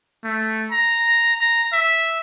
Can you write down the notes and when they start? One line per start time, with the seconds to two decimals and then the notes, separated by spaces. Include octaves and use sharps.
0.24 A3
0.72 A#5
1.41 A#5
1.73 E5